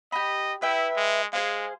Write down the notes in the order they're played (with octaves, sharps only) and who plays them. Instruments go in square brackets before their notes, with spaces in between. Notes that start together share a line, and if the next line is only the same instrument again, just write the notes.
[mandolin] G4 B5 [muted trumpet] D#5
[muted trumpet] E4 [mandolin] B4 E5 G5
[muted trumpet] G#3
[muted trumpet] G#3 [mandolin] G#4 C5 F5